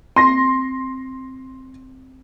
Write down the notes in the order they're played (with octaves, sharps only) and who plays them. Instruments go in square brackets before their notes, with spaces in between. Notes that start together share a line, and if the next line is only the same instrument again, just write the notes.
[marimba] C4 [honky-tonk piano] C6 A#6